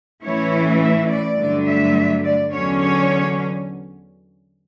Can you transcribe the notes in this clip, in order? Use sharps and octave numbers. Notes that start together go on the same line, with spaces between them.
A2 E3 A3 C#4 E4 C#5
E5
D5
G2 D3 F#3 A3
E5
D5
E2 D3 F#3 C#4 C#5
C#5